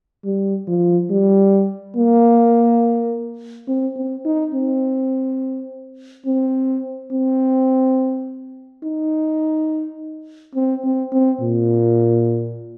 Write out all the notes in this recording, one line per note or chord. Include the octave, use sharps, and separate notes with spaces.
G3
F3
G3
A#3
C4
C4
D#4
C4
C4
C4
D#4
C4
C4
C4
A#2